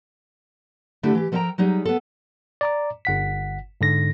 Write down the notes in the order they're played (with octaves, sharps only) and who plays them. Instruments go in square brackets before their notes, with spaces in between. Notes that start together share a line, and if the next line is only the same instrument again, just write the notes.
[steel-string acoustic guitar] D3 A3 D4 E4 G4 A4
E3 G4
F3 A4 A#4 D#5 G5 A#5
F#3 G3 D#4 G#4
B3 A4
[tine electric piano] D5 A#5 D6
G1 F#5 B6
G#2 D3 A#6